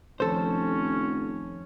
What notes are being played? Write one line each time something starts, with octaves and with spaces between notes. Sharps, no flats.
F1 D#3 F3 C#4 A4 C5